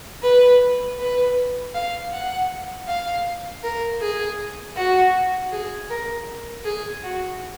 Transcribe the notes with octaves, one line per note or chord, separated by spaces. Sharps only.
B4
B4
F5
F#5
F5
A#4
G#4
F#4
G#4
A#4
G#4
F#4